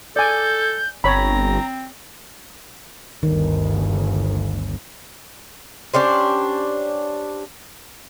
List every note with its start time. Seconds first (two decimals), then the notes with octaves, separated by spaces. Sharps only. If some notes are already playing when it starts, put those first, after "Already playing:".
0.16 A4 D5 G#5 G6
1.04 G1 C4 C#5 A#5 B5
3.23 G1 D2 D#3
5.94 C#4 D4 G4 C5